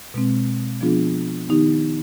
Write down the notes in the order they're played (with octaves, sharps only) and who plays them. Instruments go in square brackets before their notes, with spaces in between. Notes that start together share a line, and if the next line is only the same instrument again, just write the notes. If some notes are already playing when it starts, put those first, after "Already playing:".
[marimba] B2 G#3 C4
F3 B3 D4 F4 G#4
D#3 B3 D#4 G4